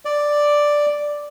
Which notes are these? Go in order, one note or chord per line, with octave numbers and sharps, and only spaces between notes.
D5